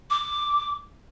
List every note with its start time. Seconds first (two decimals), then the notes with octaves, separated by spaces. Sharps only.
0.10 D6